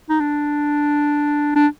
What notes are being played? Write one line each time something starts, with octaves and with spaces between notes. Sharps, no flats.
D#4
D4
D4